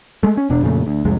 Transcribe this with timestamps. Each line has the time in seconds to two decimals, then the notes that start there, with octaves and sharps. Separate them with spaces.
0.23 G#3 A3
0.37 C#4
0.50 E1 B2 D4
0.62 F2 A#2 C#3 A3
0.87 D2
1.05 C2 F2 G#3